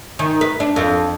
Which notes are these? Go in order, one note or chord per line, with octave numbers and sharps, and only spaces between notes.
D#3
B4
D4
F2